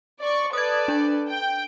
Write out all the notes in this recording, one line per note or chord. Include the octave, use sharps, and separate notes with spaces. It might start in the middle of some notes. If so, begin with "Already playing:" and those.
D5 C#6
A4 B4 D5 D#6 G#6
D4
G5